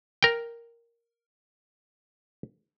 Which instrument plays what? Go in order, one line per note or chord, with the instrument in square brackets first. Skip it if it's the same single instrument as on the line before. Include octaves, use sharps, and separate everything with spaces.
[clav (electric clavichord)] A#4 G5